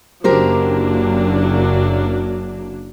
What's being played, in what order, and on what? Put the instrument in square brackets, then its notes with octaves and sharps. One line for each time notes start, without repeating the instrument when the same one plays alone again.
[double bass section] F#1 A#3 [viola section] F#3 D4 [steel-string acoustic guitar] G4 A#4 C5